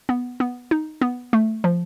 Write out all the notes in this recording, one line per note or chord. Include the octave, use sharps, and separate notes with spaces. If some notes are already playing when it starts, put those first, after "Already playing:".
B3
B3
D#4
B3
A3
F3